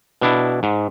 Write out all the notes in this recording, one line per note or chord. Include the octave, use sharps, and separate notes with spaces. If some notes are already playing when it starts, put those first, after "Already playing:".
B2 D4 E4
G#2